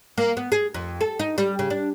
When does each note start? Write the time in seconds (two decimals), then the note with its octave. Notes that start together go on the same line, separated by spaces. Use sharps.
0.18 A#3
0.37 B3
0.52 G#4
0.74 F2
1.01 A4
1.19 D#4
1.38 G3
1.59 C#3
1.70 D4